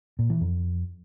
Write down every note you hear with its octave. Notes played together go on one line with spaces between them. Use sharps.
A#2
E3
F2